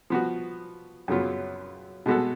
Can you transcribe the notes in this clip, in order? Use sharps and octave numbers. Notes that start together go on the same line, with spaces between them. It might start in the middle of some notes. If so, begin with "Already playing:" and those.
F3 B3 F#4
F#2 C#3 F#3 B3 F4
B2 G#3 B3 F#4 A4